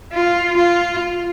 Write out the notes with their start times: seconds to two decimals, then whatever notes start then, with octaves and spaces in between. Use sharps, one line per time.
0.12 F4
0.57 F4